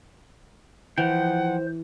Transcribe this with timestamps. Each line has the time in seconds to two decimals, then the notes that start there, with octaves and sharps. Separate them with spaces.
0.98 E3 F3 C5 F#5 G5